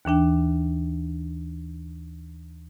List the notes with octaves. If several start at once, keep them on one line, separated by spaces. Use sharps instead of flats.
D#2 E3 D4 G5